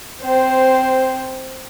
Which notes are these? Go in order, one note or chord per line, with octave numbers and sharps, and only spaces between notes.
C4 C5